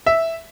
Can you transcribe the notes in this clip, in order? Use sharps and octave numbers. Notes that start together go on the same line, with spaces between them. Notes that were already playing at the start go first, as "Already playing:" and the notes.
E5